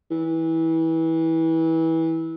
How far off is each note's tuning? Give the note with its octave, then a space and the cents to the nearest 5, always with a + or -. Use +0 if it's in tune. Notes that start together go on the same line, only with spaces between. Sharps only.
E3 -25